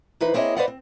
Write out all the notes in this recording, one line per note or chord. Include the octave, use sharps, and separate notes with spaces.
E3 D#4 B4 C5
A#3 C4 E4 G#4 C#5 D#5
B4 C5 D5 D#5 F5 F#5
C4